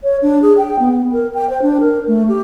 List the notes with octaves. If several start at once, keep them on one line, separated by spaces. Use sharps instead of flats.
C#5
D4
G#4
G5
B3
A#4
G5
C5
D4
A#4
A3
G4